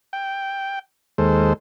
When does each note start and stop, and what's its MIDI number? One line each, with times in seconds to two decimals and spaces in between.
0.13 0.79 79
1.18 1.53 39
1.18 1.53 56
1.18 1.53 69
1.18 1.53 72